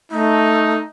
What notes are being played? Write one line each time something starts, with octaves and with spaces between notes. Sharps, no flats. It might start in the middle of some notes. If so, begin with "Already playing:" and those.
A3 D#4